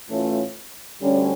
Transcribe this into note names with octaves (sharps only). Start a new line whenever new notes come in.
A2 E3 A3 C#4 F4
D2 D3 G3 C#4